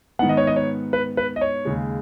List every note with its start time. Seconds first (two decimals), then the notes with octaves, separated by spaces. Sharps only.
0.19 G#2 D#3 B3 F#5
0.29 D#5
0.37 C#5
0.47 D#5
0.56 C#5
0.93 B4
1.17 B4
1.36 D#5
1.41 C#5
1.65 D#2 C#3 G#3